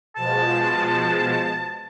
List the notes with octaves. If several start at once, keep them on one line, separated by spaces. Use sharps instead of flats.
B2 F3 G#3 A5